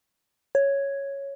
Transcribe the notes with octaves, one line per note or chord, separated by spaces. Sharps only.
C#5